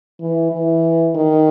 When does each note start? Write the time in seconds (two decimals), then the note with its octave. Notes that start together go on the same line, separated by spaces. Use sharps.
0.21 E3
0.52 E3
1.15 D#3